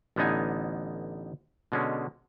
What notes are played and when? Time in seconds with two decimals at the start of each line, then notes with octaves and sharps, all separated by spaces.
0.16 A1 D3 B3 D#4 G#5
1.72 B2 D3 G#3 C#4